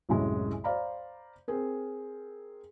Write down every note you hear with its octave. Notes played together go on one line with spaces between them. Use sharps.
C2 F#2 A2 G#3
C5 D5 F5 A#5 B5
C4 G#4 A#4